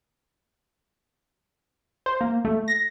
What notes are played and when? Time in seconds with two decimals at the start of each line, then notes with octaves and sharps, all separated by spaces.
2.06 C5
2.21 A#3
2.45 A3
2.68 A#6